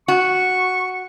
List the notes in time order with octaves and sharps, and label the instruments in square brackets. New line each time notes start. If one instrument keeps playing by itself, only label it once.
[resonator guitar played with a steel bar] F#4 [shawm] C#6